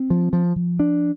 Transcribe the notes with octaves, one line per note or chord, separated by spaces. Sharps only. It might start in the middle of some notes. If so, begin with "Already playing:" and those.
Already playing: C4
F3
F3
F3
D4